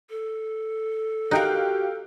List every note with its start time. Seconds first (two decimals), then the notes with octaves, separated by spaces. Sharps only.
0.10 A4
1.31 D#4 F#4 G4 A#4 F5 G5 F#6